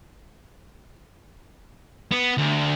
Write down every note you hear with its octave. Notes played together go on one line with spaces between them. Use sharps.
B3
D2